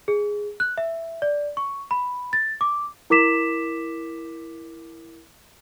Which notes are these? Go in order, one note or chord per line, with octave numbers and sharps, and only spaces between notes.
G#4
F#6
E5
D5
C#6
B5
A6
D6
E4 A#4 D6 B6 E7